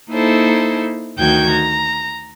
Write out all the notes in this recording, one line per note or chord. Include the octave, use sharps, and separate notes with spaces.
A#3 D#4 E4 A4 C5
D2 D#3 F#4 G5 G6 G#6
A#5